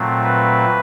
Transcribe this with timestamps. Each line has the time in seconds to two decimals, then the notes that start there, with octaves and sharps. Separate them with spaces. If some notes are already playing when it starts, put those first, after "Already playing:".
Already playing: A#2 F#3 A3 C4
0.24 B4